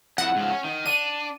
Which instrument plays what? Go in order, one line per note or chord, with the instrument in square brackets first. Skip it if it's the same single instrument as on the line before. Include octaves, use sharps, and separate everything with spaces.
[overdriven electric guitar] F2 E4 [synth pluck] F#5
[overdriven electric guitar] G#2 F3
C#4
D#3
[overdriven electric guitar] D4 [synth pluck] D#7